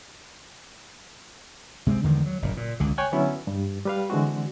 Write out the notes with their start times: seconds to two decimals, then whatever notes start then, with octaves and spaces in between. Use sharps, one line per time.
1.87 C3 G#3 A3 C4
2.04 E2 D3 D#3 G#3
2.26 F#3
2.42 F#1 A#2
2.57 A#2
2.80 C#2 D3
2.98 C#5 G5 G#5 F#6 G#6
3.12 D3 F#3 B3 C#4 E4
3.47 G2
3.85 G3 B4 F5
4.10 D3 E3 G#3 C4 F#4